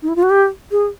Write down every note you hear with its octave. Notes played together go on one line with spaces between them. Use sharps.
D#4
E4
F4
F#4
G4
G#4